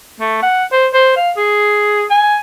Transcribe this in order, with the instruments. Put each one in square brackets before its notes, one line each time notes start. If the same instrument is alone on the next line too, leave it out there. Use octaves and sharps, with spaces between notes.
[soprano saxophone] A3
F#5
C5
C5
F5
G#4
G#5